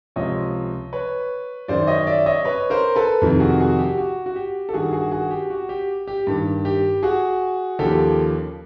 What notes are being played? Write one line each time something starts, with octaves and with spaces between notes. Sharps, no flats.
C#2 C3 F3 C#5 D#5
B4 C#5
F#2 D#3 C5 D5
C#5 D#5
D5 E5
C#5 D#5
B4 C#5
A#4 C5
A4 B4
F2 C3 D#3
F#4 G#4
F#4 G#4
G4
F#4
F#4
G4
A4
G2 D#3 F#4 G#4
F#4 G#4
F#4 G#4
G4
F#4
G4
G4
G2 D#3
G4
F#4 G#4
D#2 C#3 F3 G4 A4